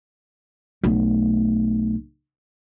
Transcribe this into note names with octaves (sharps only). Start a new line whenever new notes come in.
B1 A3